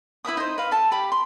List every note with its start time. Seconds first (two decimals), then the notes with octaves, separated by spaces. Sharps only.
0.25 E4 B4 E5 D#6
0.37 D#4 C5
0.58 B4 F5
0.71 A4 A5
0.91 G4 B5
1.12 C6